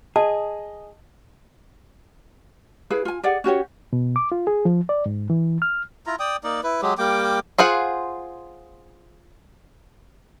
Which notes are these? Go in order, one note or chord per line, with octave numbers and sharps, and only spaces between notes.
G#4 D#5 A5
E4 G#4 B4 F5
F4 G#5
G4 G#4 D5 F#5
C#4 F#4 G4 C#5
B2
D6
F4
G#4
F3
D5
G#2
E3
F6
E4 F4 A#5
D5 G5 D#6
A#3 D#4 D5
E4 B4
F#3 G#3 G4
G3 A#3 G5 D6
F4 G#4 C5 F#5